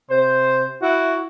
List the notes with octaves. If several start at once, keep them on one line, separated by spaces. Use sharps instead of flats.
C3 C5
E4 F#4